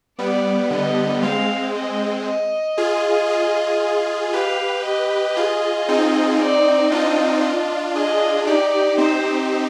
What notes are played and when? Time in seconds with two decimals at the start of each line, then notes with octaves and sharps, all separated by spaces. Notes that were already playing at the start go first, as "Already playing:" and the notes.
0.19 G3 B3 D5
0.71 D3 D#5
1.23 G#3 C4 F5
1.74 D#5
2.26 D#5
2.77 F4 G#4
3.29 F4 G#4
4.33 G4 B4 F5
4.84 D#5
5.36 F4 G#4
5.88 C4 D#4
6.40 D5
6.91 D4 F4 D#5
7.43 D#5
7.95 F4 G#4 D#5
8.47 D#4 G4 D5
8.98 C4 D#4 C5